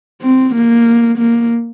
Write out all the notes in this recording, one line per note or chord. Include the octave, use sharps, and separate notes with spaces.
C4
A#3
A#3